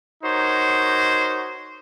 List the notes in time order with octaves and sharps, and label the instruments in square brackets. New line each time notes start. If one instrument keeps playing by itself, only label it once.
[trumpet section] D#4 F#4 A#4 C5 C#5